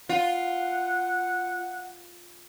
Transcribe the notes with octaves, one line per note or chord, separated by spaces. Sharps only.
F4 F#5